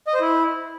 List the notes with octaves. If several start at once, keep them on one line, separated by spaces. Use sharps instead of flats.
D#5
C5
E4